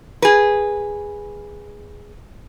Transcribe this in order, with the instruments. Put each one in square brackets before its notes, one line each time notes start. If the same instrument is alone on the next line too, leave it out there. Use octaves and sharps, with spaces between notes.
[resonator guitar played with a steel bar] G#4 B4